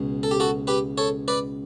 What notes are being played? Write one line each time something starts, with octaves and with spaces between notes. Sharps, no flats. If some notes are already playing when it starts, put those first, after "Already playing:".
Already playing: C#2 B2
A4
G4
F#4 A4
G4 B4
A4 C#5
B4 D5